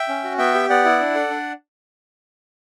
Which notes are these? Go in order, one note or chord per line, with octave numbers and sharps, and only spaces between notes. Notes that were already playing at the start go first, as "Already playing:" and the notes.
Already playing: E5 G5
C#4
F#4
B3 E5 G5
G4
B3 D5 F#5
E4
D4
A4
D4